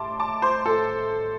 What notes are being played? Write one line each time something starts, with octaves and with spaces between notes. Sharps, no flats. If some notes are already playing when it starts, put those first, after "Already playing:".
Already playing: A2 G3 A5 C6 D6
A5 D6
C5
A4